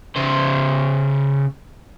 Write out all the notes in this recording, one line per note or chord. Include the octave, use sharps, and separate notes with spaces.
C#3 C5